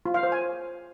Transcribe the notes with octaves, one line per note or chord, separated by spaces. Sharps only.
F4
F5
C5
G#5